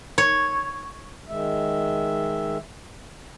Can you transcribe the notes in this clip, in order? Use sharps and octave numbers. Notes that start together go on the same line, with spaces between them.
C#5
D#3 G#3 E5